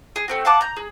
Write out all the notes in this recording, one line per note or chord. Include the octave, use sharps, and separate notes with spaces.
G#4
A3 C4 F#4
F5 F#5 A5 D6
A#5 G6
G#4